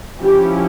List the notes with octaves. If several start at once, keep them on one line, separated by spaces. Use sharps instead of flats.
F3 C#4 E4 G4